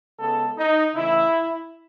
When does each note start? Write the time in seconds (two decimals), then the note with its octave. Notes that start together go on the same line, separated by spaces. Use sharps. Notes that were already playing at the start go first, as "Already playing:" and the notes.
0.19 C#3 G#3 B3 A4
0.57 D#4
0.95 C#3 E3 A3 E4